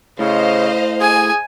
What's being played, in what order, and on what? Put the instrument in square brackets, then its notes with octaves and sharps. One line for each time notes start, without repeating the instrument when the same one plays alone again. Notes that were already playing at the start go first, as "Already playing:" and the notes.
[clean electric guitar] A2 [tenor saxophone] C#3 [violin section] C5 D#5 F5
[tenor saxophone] G#4 [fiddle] G#5